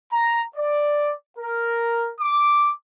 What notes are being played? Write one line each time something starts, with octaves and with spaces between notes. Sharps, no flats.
A#5
D5
A#4
D6